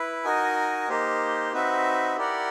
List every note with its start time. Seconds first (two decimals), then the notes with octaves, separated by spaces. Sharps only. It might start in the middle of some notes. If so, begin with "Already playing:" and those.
Already playing: E4 B4
0.25 D#4 F#4 A#4 D#5 G#5
0.89 A#3 D#4 G4 C5
1.53 C4 D#4 F#4 B4 E5
2.16 E4 G4 A#4 D5 F#5